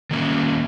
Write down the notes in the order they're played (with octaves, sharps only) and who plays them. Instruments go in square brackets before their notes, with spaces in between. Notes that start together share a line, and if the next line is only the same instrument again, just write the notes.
[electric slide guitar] D#3 A#3 C#4